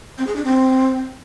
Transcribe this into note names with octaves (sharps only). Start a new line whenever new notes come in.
C4
G#4
D4
C4